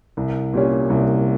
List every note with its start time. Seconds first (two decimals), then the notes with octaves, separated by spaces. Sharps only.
0.17 C2
0.54 A#2 G3 C#4
0.90 C2